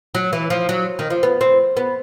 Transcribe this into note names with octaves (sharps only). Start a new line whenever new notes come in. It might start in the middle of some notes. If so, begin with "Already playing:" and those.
F#3
E3
F3
F#3
D#3
F3
B3
C4
B3